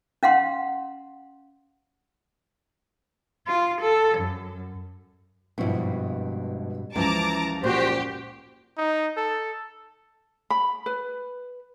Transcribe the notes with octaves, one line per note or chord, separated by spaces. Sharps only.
C#4 F5 F#5 C6
F4
A4
F#2
G#1 G2 B2 F3 E4
C#2 F#2 E3 F3 A5 A#5 D6
A#2 F#4 G4 C5 G5
D#4
A4
B5
B4